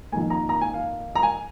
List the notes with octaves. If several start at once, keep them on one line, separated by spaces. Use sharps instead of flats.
F2 D#3 A#3 G#5
A#5
A#5
G#5
F5
A#5
G#5